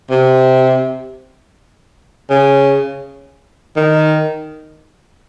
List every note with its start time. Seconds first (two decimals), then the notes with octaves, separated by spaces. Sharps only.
0.10 C3
2.30 C#3
3.76 D#3